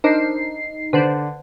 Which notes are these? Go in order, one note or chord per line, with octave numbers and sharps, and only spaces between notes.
D4 D#4 A#4 C5 C7
D3 B4 C5 D5